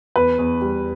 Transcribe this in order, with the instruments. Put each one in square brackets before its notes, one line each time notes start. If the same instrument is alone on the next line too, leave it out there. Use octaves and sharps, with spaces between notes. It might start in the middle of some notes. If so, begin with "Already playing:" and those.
[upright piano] E2 B4
E2
G3